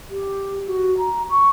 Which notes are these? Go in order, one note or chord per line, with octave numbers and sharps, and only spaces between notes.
G4
F#4
A#5
C#6